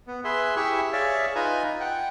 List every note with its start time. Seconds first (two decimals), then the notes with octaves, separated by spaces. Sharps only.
0.07 B3
0.24 G#4 B4 E5 C6
0.56 E4 G4 G#4 C#6 E6
0.93 G#4 C#5 D5 E5 F5
1.35 D#4 F4 B4 G#5 A#5
1.80 F#5 G5